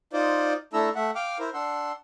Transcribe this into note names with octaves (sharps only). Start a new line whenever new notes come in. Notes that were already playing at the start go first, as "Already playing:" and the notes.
D#4 F4 C5 D5
A3 D4 E4 A4 A#5 E6
A3 E5 F#5
F5 G5 D6 F6
E4 A#4 C5
D4 F#5 C6 E6